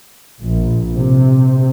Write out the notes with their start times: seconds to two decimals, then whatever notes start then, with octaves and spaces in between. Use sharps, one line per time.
0.41 A#1
0.95 C3